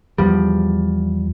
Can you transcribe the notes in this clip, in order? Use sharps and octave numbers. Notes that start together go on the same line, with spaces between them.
E2 F3 G3